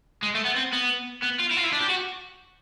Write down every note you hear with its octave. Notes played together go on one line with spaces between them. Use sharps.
G#3
A3
B3
C4
B3
B3
F4
E4
F4
E4
D4
G4
F#4